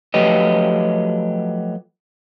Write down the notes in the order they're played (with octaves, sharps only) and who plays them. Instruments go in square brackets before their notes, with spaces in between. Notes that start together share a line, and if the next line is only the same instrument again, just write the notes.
[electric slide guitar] F3 F#3 A3 G4 B4 D#5